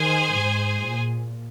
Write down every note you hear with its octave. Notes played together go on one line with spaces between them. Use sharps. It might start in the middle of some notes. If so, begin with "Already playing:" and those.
Already playing: D#3 G#4 C5 G#5
G#2
A#2